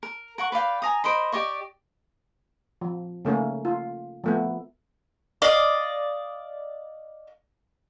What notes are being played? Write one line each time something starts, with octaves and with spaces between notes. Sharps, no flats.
A#4
A#4 F#5 C#6
B4 D5 F5 G5
G#5 A#5 D#6
A#4 C5 D#5 B5
G4 D5 D#5 C#6
F3
C#3 A3 A#3 C#4
F4
F3 A3 B3
D5 D#5 F5